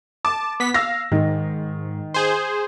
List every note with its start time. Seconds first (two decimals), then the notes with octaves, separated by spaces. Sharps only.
0.25 A5 D6
0.60 B3 B6
0.74 F5 E6 A#6
1.12 G#2 D#3
2.14 G#4 C5